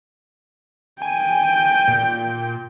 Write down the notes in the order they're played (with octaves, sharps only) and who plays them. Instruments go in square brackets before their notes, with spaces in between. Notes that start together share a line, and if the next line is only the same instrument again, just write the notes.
[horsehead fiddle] G5 [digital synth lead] G#5
[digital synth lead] A#2